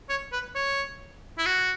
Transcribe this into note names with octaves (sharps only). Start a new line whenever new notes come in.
C#5
B4
C#5
E4
F#4